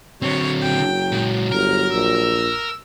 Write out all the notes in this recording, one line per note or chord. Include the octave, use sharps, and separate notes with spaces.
D3 F#3 C4 C#5
F#1 G5
A#2 G#3
G1 A#4 F6
A#1 E6